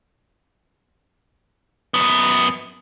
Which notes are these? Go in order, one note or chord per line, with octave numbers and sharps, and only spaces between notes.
F#2 B3